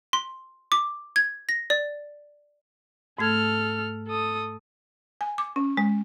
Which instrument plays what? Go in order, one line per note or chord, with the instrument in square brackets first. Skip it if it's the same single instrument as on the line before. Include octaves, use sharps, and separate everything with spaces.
[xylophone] C6
D6
G#6
A#6
D5
[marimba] G#2 A3 G#6 [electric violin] A4 F6
[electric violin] A4 D#6
[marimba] G#5
D6
C#4
G#3